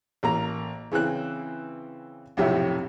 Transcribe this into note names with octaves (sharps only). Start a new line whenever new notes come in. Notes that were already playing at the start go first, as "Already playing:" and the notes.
A1 A#3 A#5
C#3 E3 C4 F#6
B1 F2 A2 C3 G4 E5